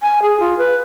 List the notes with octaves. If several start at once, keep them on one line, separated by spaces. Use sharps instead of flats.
G#5
G#4
F4
B4